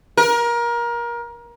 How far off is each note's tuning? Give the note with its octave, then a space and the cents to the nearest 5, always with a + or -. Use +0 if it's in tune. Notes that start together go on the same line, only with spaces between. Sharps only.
A#4 +25